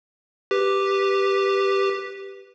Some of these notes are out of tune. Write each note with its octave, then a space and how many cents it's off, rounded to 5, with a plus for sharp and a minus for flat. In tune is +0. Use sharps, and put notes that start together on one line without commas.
G4 +0 B4 +0